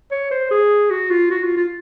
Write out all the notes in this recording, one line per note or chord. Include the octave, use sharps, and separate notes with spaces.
C#5
C5
G#4
F#4
F4
F#4
F4
F4